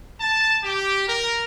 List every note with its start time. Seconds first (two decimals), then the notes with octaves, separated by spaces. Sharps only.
0.20 A5
0.64 G4
1.08 A#4